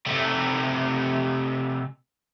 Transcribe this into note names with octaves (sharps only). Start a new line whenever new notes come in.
C3 A3